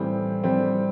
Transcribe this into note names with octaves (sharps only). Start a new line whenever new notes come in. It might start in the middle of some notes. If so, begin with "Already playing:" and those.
Already playing: A2 E3 G3 C4
G3 C4